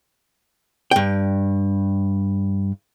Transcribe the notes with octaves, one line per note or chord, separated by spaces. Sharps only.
G2 G5